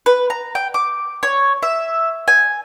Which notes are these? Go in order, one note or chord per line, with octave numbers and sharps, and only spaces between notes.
B4
A#5
G5
D6
C#5
E5
G#5